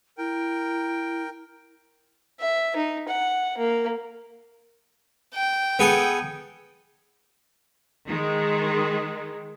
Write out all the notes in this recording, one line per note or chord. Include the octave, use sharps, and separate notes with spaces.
E4 A#4 G5
E5
D#4
F#5
A#3
G5
B3 G#4 A4
D#3 G#3